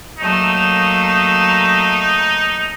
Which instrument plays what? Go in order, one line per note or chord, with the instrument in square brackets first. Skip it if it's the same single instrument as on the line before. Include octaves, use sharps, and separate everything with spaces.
[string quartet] F#3 A3 A#3 [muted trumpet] D#4